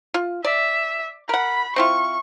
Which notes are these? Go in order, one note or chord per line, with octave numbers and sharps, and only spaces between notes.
F4
D5 E5
A#4 F#5 B5
C4 E4 F4 C#6